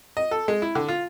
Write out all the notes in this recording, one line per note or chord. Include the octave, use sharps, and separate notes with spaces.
D#5
A4
G#3
E4
D3
F4